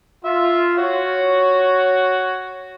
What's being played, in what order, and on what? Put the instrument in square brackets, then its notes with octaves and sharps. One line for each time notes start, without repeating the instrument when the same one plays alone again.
[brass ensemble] F4 [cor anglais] E5
[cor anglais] F#4 [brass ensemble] C#5